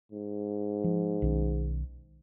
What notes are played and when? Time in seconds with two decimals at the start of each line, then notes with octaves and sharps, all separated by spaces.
0.12 G#2
0.84 F3
1.22 B1 D#3 C#4